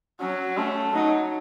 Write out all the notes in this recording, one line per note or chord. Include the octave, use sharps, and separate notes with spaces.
F#3 C#4
A3 C#4
F#3 D#4